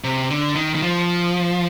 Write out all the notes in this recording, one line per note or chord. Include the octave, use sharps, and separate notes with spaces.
C3
D3
D#3
D#3
F3